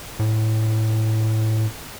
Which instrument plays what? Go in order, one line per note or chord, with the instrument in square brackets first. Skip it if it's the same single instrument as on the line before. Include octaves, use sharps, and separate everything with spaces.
[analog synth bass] A2